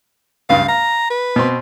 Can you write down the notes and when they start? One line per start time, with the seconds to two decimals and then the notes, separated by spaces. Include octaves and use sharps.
0.49 C#2 G2 F5
0.68 F5 A#5
1.10 B4
1.36 B2 C4 C6